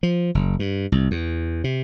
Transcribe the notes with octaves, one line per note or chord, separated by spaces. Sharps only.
F3
F#1
G2
C2
E2
C3